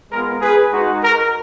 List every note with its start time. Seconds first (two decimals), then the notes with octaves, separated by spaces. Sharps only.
0.12 G#3 B3 F4 A#4
0.41 G#4 B4
0.72 G#3 D#4 F#4
1.02 A#4